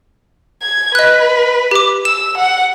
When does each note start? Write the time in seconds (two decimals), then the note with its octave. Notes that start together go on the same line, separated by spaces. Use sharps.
0.62 G#6
0.95 B4 D#5 F#6
1.71 G4 D6
2.05 E6 E7
2.38 F#5